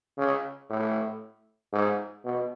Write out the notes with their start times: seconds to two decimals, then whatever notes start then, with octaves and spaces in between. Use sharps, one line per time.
0.18 C#3
0.70 A2
1.73 G#2
2.25 B2